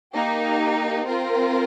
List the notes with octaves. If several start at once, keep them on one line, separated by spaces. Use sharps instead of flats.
A#3 D#4 G4
C4 F4 A#4